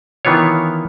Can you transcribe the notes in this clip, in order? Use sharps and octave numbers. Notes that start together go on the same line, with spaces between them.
D#3 E3 B3 F4 C#5